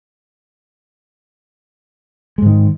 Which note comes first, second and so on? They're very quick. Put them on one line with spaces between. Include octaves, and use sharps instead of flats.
G#3 G#2 D#3